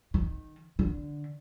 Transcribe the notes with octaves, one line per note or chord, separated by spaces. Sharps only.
D#3
D3